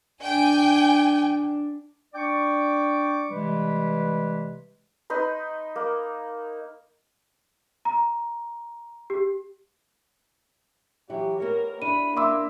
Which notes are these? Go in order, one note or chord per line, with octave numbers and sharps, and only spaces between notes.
D4 G5 G#5
D4 D5 G5 C#6 D6
C3 E3 G3 G#3 B4
D#4 B4 C6
A#3
A#5
G4
E3 F#3 E4 G4
A#3 B3 A#4 C#5
D4 E4 B5 D#7
A#3 E5 B5 C6 D6 E6